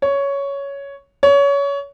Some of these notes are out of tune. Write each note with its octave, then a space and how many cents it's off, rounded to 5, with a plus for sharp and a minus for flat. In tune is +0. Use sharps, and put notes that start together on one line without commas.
C#5 +10
C#5 +25